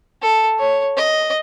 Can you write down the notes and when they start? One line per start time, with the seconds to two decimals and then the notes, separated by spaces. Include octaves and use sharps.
0.22 A4
0.59 C#5
0.97 D#5